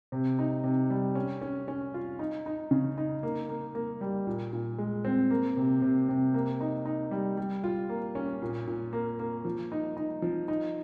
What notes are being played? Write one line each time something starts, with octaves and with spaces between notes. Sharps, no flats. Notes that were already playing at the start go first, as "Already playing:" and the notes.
C3
D#4
C3
G3
C#4
C#4
C#4
F4
D#4
D#4
C#3
D#4
A#3
A#3
A#3
G3
A#2
A#2
G#3
C4
A#3
C3
C3
C3
A#3
D#4
D#4
G3
G3
F4
A#3
C#4
A#2
A#2
A#3
A#3
F3
D#4
D#4
F3
D#4